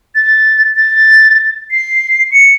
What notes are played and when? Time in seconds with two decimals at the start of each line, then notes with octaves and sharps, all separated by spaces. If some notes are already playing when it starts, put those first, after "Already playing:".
0.15 A6
0.76 A6
1.71 C7
2.32 C#7